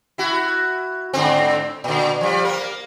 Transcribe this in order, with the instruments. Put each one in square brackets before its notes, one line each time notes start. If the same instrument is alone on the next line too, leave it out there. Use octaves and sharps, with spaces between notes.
[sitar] E4 F#4
G#2 D3 C4
A#2 D3
F3 G3
A#3 A#4